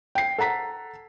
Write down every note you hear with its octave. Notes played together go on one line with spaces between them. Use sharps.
G5 C7
A4 F#5 A#5 B6